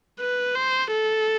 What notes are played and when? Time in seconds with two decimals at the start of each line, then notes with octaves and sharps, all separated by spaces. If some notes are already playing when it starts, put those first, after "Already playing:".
0.20 B4
0.55 C5
0.92 A4